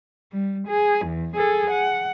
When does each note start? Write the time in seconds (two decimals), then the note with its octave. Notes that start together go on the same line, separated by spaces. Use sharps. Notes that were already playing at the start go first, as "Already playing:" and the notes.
0.32 G3
0.68 G#4
1.06 E2
1.37 G#4 A4
1.71 F#5